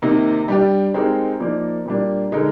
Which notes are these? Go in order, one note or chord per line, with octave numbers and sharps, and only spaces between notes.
C3 D#3 A#3 D#4
G3 D4 G4
G#3 C4 D#4 G4 A#4
F3 A#3 D#4 A#4 D5
A#2 G3 A#3 D4
D3 G#3 D#4 A#4